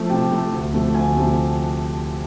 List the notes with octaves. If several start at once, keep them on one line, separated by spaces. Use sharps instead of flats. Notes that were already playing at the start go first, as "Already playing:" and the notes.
Already playing: F3 A3
C3 G5
F3 A3
D2
C3 F3 A3
D2 G#5
C3 F3 A3